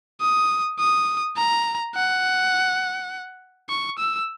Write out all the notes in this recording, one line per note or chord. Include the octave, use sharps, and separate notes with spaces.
D#6
D#6
A#5
F#5
C#6
E6